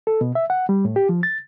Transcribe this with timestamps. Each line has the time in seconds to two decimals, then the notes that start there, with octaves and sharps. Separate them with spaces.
0.07 A4
0.21 B2
0.35 E5
0.50 F#5
0.69 G3
0.85 A2
0.96 G4
1.09 F3
1.23 A6